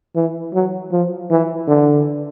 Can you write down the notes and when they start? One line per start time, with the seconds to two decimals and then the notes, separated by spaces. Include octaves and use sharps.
0.16 E3
0.54 F#3
0.92 F3
1.30 E3
1.68 D3